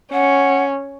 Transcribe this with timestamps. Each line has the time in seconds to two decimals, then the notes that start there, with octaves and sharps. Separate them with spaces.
0.13 C#4 F#5